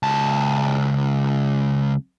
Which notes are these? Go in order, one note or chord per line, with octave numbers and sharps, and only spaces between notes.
C#2 A5